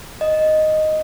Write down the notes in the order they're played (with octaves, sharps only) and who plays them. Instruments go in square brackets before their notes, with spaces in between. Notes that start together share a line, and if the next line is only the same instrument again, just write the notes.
[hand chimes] D#5